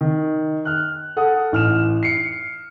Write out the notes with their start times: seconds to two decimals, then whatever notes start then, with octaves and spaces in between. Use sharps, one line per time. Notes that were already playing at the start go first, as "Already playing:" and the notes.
0.01 D#3
0.65 F6 F#6
1.17 A4 F#5 D#6
1.52 A1 F6 E7
2.03 C7 C#7